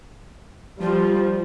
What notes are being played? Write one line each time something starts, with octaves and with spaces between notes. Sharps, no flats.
F3 G3 F4